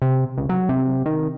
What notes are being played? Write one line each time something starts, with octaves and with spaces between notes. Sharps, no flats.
C3
C#2
F#3
C3
D#3